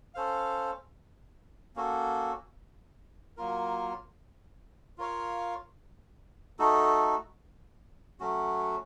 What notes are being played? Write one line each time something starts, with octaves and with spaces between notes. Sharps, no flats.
C#4 A4 C5 F5
A#3 C#4 F#4 A4
F#3 A#3 F4 A#4
F4 A#4 C#5 F5
A3 D#4 F#4 A4
F#3 A3 C#4 F#4